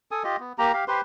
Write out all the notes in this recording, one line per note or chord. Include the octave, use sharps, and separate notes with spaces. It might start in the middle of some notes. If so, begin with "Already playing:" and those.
A4 G#5 D#6
F4 G4 D#5
B3
A#3 G4 A#5
G4 F5
G4 B4 C5 C6